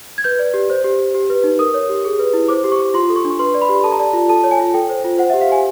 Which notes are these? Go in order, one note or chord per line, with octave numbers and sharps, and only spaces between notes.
G#6
B4 G6
D5
G4
C5
G4
G4
G4
B4
D#4
A#4 D#6
C#5
G4
G#4
B4
E4
C5 D6
G4
C#6
G4
F4 C6
A4
C#6
D4
C#6
B4 C6
D5
B5
G4
A4 A5
A#5
D5 A5
F4
A4 A5
C#5
G#5
F4
A4 G5
C5
F4
C5 F#5
E5
G4
F5
G4 G#5